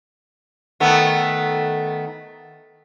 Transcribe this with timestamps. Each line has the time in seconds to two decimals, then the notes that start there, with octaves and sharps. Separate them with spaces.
0.80 D#3 A3 B3